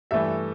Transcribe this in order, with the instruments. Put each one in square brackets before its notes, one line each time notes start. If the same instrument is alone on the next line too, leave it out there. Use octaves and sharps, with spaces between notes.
[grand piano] G2 E3 A3 E5